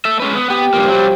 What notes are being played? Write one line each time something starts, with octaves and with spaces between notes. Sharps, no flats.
A3 A4 E5
G#3 C#4 B4
B3
B3 G4
G2 F3 A#3
F#3 G3